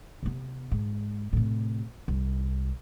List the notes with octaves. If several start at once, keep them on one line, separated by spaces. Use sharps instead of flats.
C3 B3
G#2
A2 C3
C2